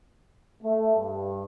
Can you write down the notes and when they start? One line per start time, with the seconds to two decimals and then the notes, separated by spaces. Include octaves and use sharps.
0.63 A3
0.96 G2